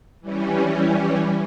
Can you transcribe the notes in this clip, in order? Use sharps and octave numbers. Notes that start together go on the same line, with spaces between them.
E3 G3 C#4